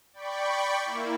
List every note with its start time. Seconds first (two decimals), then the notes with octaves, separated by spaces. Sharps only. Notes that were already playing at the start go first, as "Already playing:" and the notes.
0.13 D5 G5 B5 C#6
0.84 A#3 E4